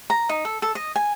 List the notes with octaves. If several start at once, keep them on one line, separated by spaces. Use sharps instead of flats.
A#5
D#4
A4
A4
D#5
G#5